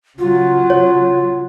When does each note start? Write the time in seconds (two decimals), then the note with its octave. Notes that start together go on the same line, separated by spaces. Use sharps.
0.19 C#3 F#3 F4
0.70 C#5